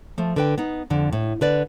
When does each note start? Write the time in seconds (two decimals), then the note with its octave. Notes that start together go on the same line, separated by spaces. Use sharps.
0.18 F3 A3
0.36 D3 B4 G5
0.58 B3 D#4
0.90 F2 D3
1.13 A2
1.41 D3 B4 D5